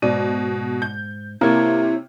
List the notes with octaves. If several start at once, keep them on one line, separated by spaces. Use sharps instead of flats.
G#2 B2 D5 D#7
G6
C3 A#3 E4 C#5